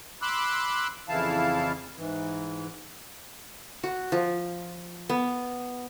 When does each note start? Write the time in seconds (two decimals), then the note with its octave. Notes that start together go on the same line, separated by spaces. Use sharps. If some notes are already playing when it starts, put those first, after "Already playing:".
0.22 B5 C6 D6 E6 F#6
1.09 F2 C#3 E3 E4 F5 A5
1.97 G#2 E3
3.83 F#4
4.12 F3
5.09 B3